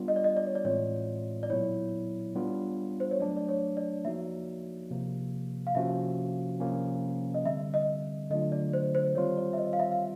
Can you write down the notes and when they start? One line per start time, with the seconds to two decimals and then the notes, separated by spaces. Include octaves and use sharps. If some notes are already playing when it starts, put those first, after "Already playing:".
Already playing: G3 B3 D4 F4
0.08 D#5
0.16 D5
0.24 D#5
0.37 D5
0.46 C#5
0.55 D5
0.64 A2 E3 G#3 C4 F4 C#5
1.43 D5
1.50 A#2 F#3 B3 E4 C#5
2.35 G3 B3 D4 F4
3.00 C5
3.11 C#5
3.20 F#3 A3 D4 D5
3.37 D5
3.49 C#5
3.77 D5
4.05 F3 A#3 D#4 F#4 E5
4.91 C3 F3 A#3
5.67 F5
5.75 C3 F3 A#3 C#4 F#4 E5
6.60 C3 F3 A#3 C#4
7.34 D#5
7.46 D3 G3 C4 E5
7.74 D#5
8.30 D3 F#3 A3 D4 F4 D#5
8.52 D5
8.73 C5
8.95 C5
9.15 D#3 G3 C4 F4 C#5
9.37 D5
9.53 E5
9.58 D#5
9.73 F5
9.79 E5
9.92 F5